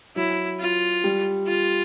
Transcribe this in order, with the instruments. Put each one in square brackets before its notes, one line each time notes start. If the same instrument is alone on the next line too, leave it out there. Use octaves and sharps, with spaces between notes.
[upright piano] F#3 [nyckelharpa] E4
[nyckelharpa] F4
[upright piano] G3
[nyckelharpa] F4